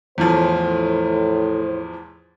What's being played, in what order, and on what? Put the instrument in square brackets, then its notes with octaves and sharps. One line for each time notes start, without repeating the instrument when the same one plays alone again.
[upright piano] E2 E3 F3 [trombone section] A2 C5